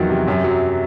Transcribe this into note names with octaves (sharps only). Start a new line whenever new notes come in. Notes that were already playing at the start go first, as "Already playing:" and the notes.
Already playing: E2 D#3 F3 F#3
C3
F#2
F#3